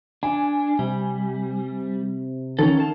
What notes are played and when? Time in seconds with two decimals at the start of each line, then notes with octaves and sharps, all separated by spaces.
0.23 D4 G#5
0.79 C3 G3
2.59 D#3 C#4 A4
2.77 A4 F5 A5